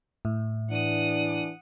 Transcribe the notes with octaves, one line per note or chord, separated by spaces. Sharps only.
A2
E3 D4 F#5 D#6